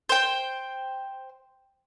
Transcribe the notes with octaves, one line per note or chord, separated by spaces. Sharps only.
C5 G5